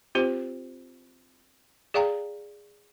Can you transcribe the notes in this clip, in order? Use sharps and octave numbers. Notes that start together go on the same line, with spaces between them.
C4 F4 G4 C5
G#4 D5 F5 G5 A#5